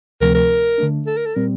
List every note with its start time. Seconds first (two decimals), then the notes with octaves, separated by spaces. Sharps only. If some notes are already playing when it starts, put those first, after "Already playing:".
0.21 D2 C3 F3 A3 C4 A#4
0.35 A#4
0.78 D3 A3 D4
1.07 A4
1.17 A#4
1.26 A4
1.35 A#2 G3 C4 A#4